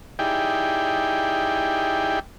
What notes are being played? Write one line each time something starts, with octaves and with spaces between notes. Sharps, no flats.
D#4 E4 G4 G#4 D5 G5